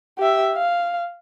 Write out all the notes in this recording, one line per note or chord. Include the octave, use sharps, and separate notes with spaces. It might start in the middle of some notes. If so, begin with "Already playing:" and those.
G4 E5
F5